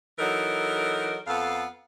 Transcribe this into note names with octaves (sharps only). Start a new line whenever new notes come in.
E3 F#3 D#4 A4 A#4
F2 B3 A4 F5